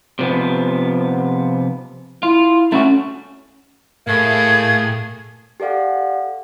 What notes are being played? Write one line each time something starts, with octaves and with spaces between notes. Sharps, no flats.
C3 F3 B3
E4 F4
A3 C#4 E4 F#4
A2 A3 A#3 G#4 G#6
G4 A4 D5 F5 F#5